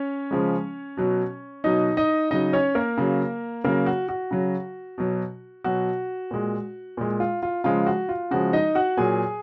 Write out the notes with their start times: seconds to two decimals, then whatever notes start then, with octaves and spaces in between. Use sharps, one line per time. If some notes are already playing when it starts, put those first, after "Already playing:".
Already playing: C#4 C#5
0.31 C#3 F3 G#3
0.97 B2 F#3
1.64 B2 F#3 D#4 D#5
1.97 D#4 D#5
2.31 C#3 F#3 D#4 D#5
2.53 C#4 C#5
2.75 A#3 A#4
2.97 C#3 F#3
3.64 C#3 F#3 A#3 A#4
3.86 F#4
4.09 F#4
4.31 C#3 F#3
4.98 B2 F#3
5.64 B2 F#3 F#4
6.31 A#2 G#3
6.97 A#2 G#3
7.20 F4
7.43 F4
7.64 C#3 F3 G#3 F4
7.86 F#4
8.09 F4
8.31 C#3 F3 G#3 F#4
8.53 D#4 D#5
8.75 F#4 F#5
8.97 A#2 F#3 G#4 G#5